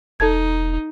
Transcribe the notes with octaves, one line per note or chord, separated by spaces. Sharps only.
E1 D#4 A4 A5 G#6